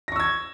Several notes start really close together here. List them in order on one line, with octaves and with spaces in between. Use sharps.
A#6 C#6 E6 G#6